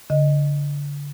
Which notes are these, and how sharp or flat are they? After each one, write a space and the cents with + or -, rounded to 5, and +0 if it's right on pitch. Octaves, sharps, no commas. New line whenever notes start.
D3 -35 D#5 +0